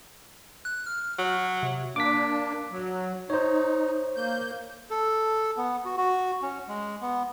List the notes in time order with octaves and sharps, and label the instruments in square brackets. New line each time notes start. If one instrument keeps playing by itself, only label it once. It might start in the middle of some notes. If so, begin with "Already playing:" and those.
[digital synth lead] F#6
F6
[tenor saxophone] F#3
[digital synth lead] C3
[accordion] A#3 D4 [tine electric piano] D6 B6
[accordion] F#3
[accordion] D#4 [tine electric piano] C5 C#5
[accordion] A#3 G6
[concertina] A4
B3
F#4
F#4
C#4
G#3
B3